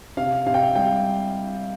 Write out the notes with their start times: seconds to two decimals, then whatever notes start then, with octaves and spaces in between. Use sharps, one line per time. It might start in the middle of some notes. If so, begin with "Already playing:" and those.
0.17 C3 F5
0.46 C3 F5
0.54 G5
0.62 F5
0.75 G3 G5